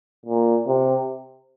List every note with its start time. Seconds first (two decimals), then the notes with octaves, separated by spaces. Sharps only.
0.26 A#2
0.67 C3